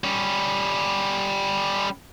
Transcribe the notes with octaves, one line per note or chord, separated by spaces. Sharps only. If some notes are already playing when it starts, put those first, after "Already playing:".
G3 C#4